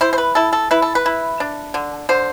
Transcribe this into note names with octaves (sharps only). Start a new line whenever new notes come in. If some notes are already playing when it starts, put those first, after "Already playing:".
E4 C5
C5
B4
E4 A4
A4
E4 B4
A4
B4
E4
D4
D3
D3 C5